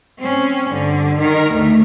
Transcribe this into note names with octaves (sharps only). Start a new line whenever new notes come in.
C4 C#4
G2 D3
D#3 A#4
D2 A3